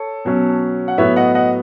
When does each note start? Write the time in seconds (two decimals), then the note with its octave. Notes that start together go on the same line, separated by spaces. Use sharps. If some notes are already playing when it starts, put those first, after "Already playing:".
Already playing: A4 C#5
0.25 B2 F#3 C#4
0.88 F#5
0.98 A2 F#3 B3 C#5 E5
1.16 D#5 F#5
1.35 D#5 F#5